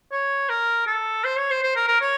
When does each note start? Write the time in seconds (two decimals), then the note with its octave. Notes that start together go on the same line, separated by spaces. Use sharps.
0.12 C#5
0.49 A#4
0.87 A4
1.24 C5
1.38 C#5
1.50 C5
1.63 C5
1.76 A#4
1.88 A#4
2.01 C#5